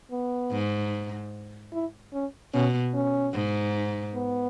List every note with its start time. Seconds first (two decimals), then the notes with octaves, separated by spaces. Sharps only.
0.11 B3
0.52 G#2
1.73 E4
2.13 C#4
2.54 B2 C#4
2.94 C#4
3.34 G#2
4.15 B3